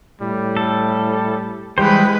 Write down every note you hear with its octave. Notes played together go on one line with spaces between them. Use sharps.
A2 G3
A4
E3 G3 G#3 B4 C5 G5